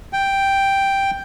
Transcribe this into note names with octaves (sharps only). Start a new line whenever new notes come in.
G5